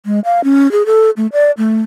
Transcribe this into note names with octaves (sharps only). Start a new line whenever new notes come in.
G#3
F5
C#4
G#4
A4
A3
D5
A3